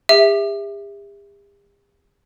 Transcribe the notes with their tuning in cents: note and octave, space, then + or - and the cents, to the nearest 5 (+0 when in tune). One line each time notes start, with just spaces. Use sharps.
G4 +45 E5 +0